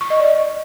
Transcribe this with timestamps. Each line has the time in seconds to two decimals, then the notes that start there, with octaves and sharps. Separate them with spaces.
0.01 C#6
0.10 D#5
0.20 D5